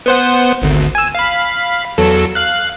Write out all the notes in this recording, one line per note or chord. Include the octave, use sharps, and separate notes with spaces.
B3 C5 F#5
G#1 D2
G#5 E6
F5 B5
E2 F#3 A4
F5 F#6